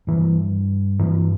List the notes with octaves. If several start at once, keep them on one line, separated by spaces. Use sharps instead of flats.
G2 E3
G2 E3